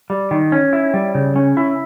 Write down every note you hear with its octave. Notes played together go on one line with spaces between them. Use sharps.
G3
D#3
C#4
E4
G3
C#3
C#4
E4